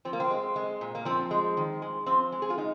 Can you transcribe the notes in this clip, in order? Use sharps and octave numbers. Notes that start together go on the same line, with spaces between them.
F3 C4
A#3
C4
G#3
G#3
A#2
A#3
F3 C4
G#3
D#3
G#3
F3 C4
G#3
G#4
F4
G#3 D#4